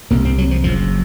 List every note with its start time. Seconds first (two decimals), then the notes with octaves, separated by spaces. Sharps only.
0.11 C2 C3 A#3
0.25 C4
0.38 F#3
0.51 F3
0.64 F#1 F#2 C#3 F3